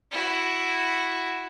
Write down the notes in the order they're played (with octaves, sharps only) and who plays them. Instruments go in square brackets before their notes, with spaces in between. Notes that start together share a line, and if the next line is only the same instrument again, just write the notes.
[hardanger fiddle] E4 F#4